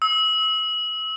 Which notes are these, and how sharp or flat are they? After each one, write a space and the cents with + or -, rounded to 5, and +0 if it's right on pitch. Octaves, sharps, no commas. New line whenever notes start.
E6 -35